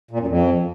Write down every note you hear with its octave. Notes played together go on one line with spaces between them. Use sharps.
A#2
F#2
F2